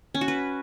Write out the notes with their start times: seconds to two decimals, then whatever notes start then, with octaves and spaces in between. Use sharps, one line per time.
0.14 C#4
0.21 F#4
0.28 B4